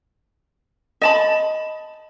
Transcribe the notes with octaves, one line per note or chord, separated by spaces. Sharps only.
D#5 A5 B5